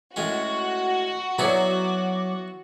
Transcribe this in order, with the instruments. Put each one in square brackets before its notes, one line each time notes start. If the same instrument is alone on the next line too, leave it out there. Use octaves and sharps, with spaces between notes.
[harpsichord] A2 G#3 C#4 [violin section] F#4
[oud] F#3 C#5 [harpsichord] B3 E4 G#4 [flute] D6